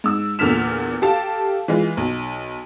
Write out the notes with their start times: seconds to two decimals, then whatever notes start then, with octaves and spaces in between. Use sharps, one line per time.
0.04 G#2 E6
0.39 E2 A#2 D3 F6 B6 E7
1.02 G4 A4 F5 A5
1.68 E3 G#3 F4
1.97 B1